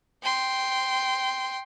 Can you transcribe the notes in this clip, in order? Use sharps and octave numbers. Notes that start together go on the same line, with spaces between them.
G5 C6